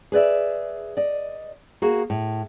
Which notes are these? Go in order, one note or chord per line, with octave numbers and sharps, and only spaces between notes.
G#4 B4 D5 E5
D5 D#5
A#3 F#4 G#4
A2